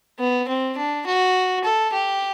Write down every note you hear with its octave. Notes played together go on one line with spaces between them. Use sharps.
B3
C4
D4
F#4
A4
G4